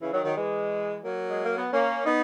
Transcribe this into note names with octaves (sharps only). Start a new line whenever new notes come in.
C#3 E3
D#3 F#3
D#3 F#3
E3 G#3
F#3 A#3
G#3
A#3
B3
A#3 C#4
B3 D#4